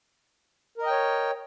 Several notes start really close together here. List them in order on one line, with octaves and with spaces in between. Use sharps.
A#4 D#5 G5 C#5